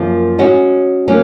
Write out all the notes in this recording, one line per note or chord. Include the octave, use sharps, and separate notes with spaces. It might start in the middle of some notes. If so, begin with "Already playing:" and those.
Already playing: F#2 F3 A#3 F4
G#3 C#4 F#4
F#3 A#3 C#4